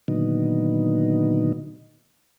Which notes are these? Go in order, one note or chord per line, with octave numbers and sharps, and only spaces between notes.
A#2 D3 D#3 F#3 B3 D#4